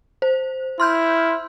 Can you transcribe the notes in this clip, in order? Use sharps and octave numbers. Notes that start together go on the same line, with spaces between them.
C5
E4 C6 F6 G6